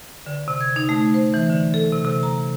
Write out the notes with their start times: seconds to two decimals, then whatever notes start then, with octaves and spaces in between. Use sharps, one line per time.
0.26 D3
0.48 C3
0.61 G#6
0.76 D#4
0.89 A3
1.14 C5
1.34 E3
1.50 D3
1.74 A4
1.92 C3
2.05 C3
2.23 A#5